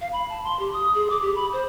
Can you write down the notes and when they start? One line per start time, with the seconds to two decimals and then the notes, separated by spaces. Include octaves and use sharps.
0.01 F5
0.13 B5
0.29 A5
0.44 C6
0.59 G4
0.73 D#6
0.95 G#4
1.10 D6
1.22 G4
1.35 B5
1.53 C5